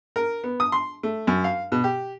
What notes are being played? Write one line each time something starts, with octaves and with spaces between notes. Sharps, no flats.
A#4
B3
D#6
C6
A3
F#2
F5
B2
G4